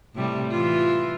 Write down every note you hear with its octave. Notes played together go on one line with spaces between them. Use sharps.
A2 C3 G3
E3 F4